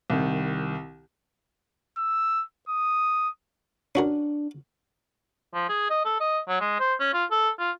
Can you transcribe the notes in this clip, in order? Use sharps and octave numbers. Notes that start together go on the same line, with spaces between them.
C2 D#3
E6
D#6
C#4 D4 F#4 A#4
F3
G#4
D#5
A4
D#5
F#3
G#3
C5
C#4
F4
A4
F4